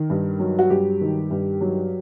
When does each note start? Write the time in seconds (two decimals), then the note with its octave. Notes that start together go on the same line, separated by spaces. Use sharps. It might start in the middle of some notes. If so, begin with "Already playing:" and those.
Already playing: D#3
0.10 G2
0.40 F#3
0.59 F#4
0.70 G2 G4
1.01 D#3
1.31 G2
1.61 F#3